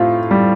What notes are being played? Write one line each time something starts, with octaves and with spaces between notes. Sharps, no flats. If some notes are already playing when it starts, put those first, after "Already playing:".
Already playing: A2 C4 F4
G3